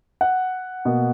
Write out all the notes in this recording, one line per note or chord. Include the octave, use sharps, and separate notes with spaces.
F#5
B2 A#3